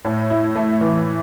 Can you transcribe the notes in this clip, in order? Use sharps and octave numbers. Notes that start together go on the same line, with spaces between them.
A2
E4
A3
E3